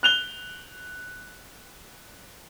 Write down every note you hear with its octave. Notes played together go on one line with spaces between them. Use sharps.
F#6 F7 G7